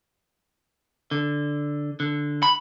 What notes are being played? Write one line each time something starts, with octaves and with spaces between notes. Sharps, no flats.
D3
D3
B5